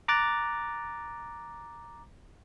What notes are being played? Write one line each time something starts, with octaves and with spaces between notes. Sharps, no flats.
A#5 D6 F#6 A6